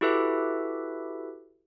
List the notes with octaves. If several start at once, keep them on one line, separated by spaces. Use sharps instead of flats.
E4 F#4 G4 A4 B4 E5